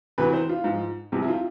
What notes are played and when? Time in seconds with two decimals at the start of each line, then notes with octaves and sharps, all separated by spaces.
0.18 D2 C3 E3 B4
0.33 C5
0.49 F4
0.64 G#2 F3
1.12 C2 C3 F3
1.22 E4
1.28 F4